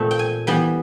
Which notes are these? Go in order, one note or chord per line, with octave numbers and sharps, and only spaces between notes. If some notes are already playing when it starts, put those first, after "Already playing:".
Already playing: A#2 A3 C4
G5
G#5
E3 G3 B3 G5